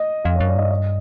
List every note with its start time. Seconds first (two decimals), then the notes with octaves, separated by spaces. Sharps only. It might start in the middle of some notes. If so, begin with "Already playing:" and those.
Already playing: D#5
0.24 F2 F5
0.36 C#5
0.40 F#2
0.47 D5
0.55 G2 D#5
0.71 D#5